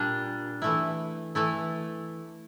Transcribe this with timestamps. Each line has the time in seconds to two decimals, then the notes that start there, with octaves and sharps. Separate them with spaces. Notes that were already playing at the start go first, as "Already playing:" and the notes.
Already playing: A#2 G3 D4
0.62 E3 A3 E4
1.35 E3 A3 E4